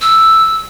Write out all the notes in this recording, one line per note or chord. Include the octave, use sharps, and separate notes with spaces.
E6